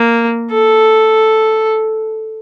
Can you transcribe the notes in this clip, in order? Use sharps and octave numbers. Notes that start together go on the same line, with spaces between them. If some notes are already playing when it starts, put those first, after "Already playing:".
Already playing: A#3
A4